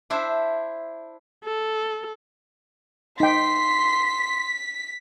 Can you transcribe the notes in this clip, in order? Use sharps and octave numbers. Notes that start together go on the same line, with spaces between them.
D4 E4 C5 E5
A4
D#4 G5 C6 B6